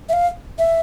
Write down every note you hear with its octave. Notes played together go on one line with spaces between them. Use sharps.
E5
F5
E5